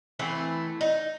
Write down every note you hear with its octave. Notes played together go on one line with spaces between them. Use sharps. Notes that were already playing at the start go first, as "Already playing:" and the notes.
E3 A3 C4
D#4